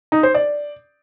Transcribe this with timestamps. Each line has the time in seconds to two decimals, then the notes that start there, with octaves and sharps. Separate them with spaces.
0.12 D#4
0.23 C5
0.34 D5